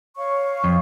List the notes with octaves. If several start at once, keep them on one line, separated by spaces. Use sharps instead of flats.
C#5 F5 C#6
F2